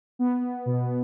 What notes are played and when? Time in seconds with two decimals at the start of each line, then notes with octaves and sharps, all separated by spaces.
0.19 B3
0.66 B2